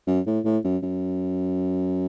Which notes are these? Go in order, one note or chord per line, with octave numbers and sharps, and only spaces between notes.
F#2
A2
A2
F#2
F#2